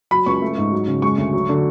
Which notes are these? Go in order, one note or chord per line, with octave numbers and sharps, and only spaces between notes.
F#3 B5
C#2 C#6
A3
G#2
F#3
C#3
G#3 C#6
D2
F#3
D3